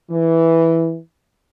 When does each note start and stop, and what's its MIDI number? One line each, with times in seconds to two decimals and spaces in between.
0.10 0.98 52